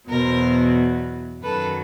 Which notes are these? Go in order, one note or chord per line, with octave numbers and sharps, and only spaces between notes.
E2 B2 F#3 A#4 C5
F#2 D#3 F#3 A4 B4